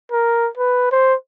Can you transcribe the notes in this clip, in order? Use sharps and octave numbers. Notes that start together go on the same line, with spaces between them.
A#4
B4
C5